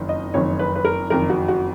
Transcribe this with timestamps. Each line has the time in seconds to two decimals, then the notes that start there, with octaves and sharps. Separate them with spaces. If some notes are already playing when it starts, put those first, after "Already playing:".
Already playing: F#1 F2 D#3
0.09 D#5
0.34 F#1 F2 D#3 C#5
0.59 B4
0.75 B4
0.85 A#4
1.10 F#1 F2 D#3 A#4
1.30 F#4
1.48 F#4